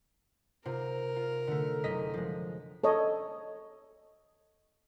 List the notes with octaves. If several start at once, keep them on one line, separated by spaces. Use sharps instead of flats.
C3 C4 F4 A#4
F4
D3 A3
F#1 D#5 B6
F3 G#3
A4 C#5 D#5